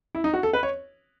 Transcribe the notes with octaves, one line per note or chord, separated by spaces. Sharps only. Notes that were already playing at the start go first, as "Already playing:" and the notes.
E4
D#4
F#4
A4
B4
C#5